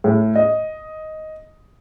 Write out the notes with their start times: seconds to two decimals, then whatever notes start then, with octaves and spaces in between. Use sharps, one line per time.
0.04 A2
0.35 D#5